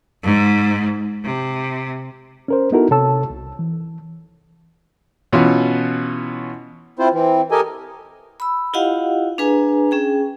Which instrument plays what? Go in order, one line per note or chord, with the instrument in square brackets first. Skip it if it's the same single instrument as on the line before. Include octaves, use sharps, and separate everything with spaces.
[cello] G#2
C3
[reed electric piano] C#4 A#4 C5
B3 D#4 E4 F#4 A4 A#4
C3 A4 C#5 A5 E6
C2
E3
[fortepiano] B2 E3 C#4 F4
[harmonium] C4 E4 F4 C5
E3 C4
G4 A4 A#4 D#5 G#5
[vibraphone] B5 E6
E4 F4 G4 D#5 F5 F#5
D4 G#4 B4 G#5 A#5
C#4 G#4 G5